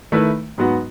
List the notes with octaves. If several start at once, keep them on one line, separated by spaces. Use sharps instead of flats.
D#3 A3 E4 B4
G#2 F#3 B3 F#4